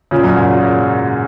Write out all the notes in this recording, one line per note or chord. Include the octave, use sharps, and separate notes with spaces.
A#2 C#3
F#2 A#2
G#2